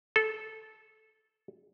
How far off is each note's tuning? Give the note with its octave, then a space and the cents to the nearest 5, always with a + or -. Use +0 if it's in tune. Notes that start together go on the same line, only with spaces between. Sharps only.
A4 -15